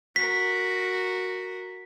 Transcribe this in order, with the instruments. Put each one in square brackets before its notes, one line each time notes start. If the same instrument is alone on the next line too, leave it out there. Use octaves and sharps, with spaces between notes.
[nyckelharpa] F#4 A#4 [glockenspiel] B6